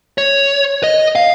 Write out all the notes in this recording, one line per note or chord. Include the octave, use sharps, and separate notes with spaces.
C#5
D#5
F5